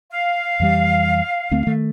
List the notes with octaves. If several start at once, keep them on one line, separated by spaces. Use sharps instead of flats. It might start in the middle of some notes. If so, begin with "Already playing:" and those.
F5
F2 E3 G3
D2 A3 C4
D#3 A3